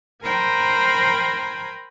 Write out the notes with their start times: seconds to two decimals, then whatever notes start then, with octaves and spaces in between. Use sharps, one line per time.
0.22 A#4 C5 G5 G#5 A#5 B5